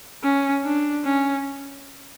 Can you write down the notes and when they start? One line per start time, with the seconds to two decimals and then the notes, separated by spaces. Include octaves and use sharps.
0.23 C#4
0.64 D4
1.04 C#4